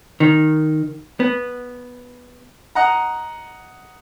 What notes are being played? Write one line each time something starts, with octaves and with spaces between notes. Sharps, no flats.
D#3
B3
D#5 F#5 A#5